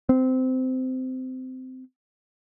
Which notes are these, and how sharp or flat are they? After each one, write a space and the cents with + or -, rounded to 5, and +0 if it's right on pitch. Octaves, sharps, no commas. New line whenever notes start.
C4 -20